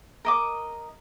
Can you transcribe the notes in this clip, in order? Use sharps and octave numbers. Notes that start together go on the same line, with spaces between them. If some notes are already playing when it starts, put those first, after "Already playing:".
A#4 D#5 D6